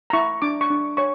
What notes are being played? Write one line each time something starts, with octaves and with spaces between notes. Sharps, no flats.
A#5
E4 C#6
D4 D6
C#6
D4
C#5 C#6